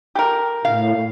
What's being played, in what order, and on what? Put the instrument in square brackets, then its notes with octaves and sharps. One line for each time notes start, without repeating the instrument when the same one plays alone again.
[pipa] G4 A4 A#4
[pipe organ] A2 [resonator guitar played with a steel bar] F5